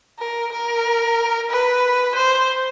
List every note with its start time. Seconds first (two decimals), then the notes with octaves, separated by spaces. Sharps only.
0.19 A#4
0.52 A#4
1.50 B4
2.15 C5